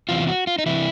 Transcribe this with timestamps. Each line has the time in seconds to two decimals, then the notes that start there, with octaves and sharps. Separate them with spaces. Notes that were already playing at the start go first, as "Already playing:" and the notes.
0.09 E2 C3 E3 F4
0.27 F#4
0.47 F4
0.59 D#4
0.66 C3 E3 E4